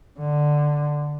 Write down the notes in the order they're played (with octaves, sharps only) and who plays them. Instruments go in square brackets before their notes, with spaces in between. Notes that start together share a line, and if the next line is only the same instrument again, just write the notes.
[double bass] D3